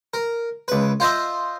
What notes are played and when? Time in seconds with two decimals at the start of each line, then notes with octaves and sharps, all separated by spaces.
0.14 A#4
0.68 C#2 B4
1.00 F4 C5 D#5 E5